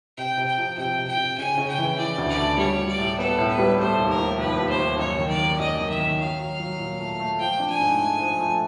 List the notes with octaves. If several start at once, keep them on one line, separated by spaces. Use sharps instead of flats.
C3 G5
C3
G5
F3
C3 G5
C3
G5
C3
C#3 G#5
C#3
G5
E3
E3 D5
D2
D5
A3
G3 C#5
G3
D5
A2
B3 A4
A2
B4
G3
A3 C5
D#2
A#4
F3
D#2 B4
D#2
C5
D#2
F#2 C#5
D#3
D5
A#3
F#2 D#5
D#3
E5
D#3
F#3 F5
F#3
F#3
A#2
A3
A3
F3 G5
D4
G#5
G#2
A3
F3
A3